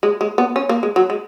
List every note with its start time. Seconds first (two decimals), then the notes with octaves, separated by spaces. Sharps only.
0.03 G#3
0.21 G#3
0.38 B3
0.56 C#4
0.69 A#3
0.83 G#3
0.96 F#3
1.10 G#3